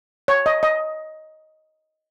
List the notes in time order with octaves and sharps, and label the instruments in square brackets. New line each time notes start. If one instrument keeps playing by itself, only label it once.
[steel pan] C#5
D#5
D#5